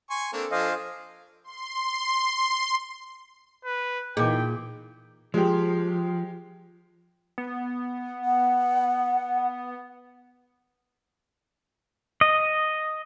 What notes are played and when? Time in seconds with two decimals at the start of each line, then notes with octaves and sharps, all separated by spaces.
0.10 G#5 C6 C#6
0.33 A#3 C4 D4 A4
0.51 F3 D4 C5 D#5 F5 G#5
1.44 C6
3.65 B4
4.17 A#2 E3 A#3 D#4 G#4 G5 D6
5.34 F3 G#3 G4
7.38 B3
8.25 F#5
12.21 D#5